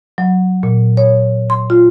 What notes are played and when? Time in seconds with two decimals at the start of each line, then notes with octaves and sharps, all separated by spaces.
0.18 F#3
0.63 A#2
0.97 C#5
1.50 C6
1.70 F4